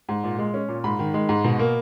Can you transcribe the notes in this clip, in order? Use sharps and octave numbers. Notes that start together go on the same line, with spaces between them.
G#2
A#2
G#3
C#4
A#2
G#2 B5
D#3
G#3
G#2
B2
A#3